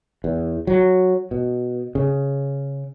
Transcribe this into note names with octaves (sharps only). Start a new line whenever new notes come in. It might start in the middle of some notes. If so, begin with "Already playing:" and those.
E2
F#3
B2
C#3